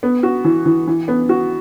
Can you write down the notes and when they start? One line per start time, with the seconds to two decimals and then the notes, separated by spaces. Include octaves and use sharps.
0.03 B3
0.23 F#4
0.45 E3
0.66 E3
0.88 E3
1.08 B3
1.29 F#4